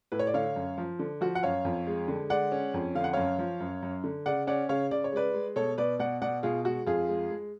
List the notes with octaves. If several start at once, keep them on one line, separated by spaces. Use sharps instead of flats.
A2 B4
C#5
D5
D3 C#5 F5
F#2
F3
D3
F3 F#4
F#5
F#2 C#5 F5
F2
G#3
D3
G#3 D5 F#5
C#4
F2
D3 F5
F#5
F#2 C#5 F5
F3
F#2
F#2
D3
C#3 D5 F#5
C#4 D5 F#5
C#3 C#5 F5
C#3 D5
C#5
G#3 B4 D5
G#3
B2 A4 C#5
B2 B4 D5
B2 D5 F#5
B2 D5 F#5
B2 F4 G#4
G#3 F#4
F2 F4 G#4
G#3
G#3